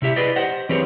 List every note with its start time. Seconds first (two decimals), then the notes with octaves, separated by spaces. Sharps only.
0.02 C3 E4 G4 E5
0.16 E4 G#4 B4 D5 D#5
0.36 G4 C5 D#5 F#5
0.69 E3 C4 G4 G#4 B4 C#5